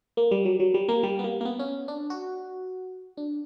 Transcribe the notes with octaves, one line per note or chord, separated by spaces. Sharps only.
A#3
G3
F#3
F#3
G3
A#3
G3
B3
A#3
A#3
B3
C#4
D4
F#4
D4